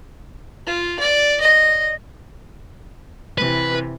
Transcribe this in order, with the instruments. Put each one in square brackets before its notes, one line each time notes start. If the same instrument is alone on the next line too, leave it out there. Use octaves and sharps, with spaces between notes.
[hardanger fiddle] F4
D5
D#5
[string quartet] C3 E3 [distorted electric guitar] B4